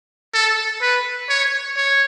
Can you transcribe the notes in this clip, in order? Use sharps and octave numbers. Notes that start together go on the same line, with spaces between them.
A4
B4
C#5
C#5